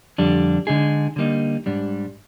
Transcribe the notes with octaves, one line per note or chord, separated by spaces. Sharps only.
F2 D3 G3 D4
D3 G#3 D#4 G#4
D3 G3 A#3 D#4
G#2 G3 D4